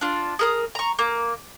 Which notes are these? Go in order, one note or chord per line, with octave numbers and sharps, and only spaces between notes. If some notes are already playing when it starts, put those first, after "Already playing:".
D4 F4
G#4 A#4 D#6
A#5 C#6
A#3